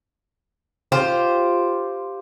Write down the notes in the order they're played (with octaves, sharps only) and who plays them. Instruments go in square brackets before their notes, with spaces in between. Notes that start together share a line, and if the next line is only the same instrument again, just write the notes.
[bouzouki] F4 G4 C5